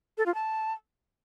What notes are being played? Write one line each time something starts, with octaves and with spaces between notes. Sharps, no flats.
A4
F4
A5